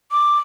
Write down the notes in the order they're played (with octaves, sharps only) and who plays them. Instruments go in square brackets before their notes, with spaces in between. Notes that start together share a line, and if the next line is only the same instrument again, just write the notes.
[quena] D6